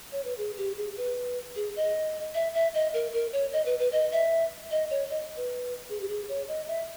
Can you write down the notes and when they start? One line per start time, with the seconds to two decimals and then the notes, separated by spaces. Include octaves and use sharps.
0.12 C#5
0.25 B4
0.38 G#4
0.58 G4
0.77 G#4
0.97 B4
1.56 G#4
1.76 D#5
2.35 E5
2.54 E5
2.74 D#5
2.94 A#4
3.13 A#4
3.33 C#5
3.53 D#5
3.66 B4
3.80 B4
3.92 D#5
4.12 E5
4.71 D#5
4.91 C#5
5.10 D#5
5.36 B4
5.89 G#4
6.01 G4
6.08 G#4
6.29 C#5
6.48 D#5
6.68 E5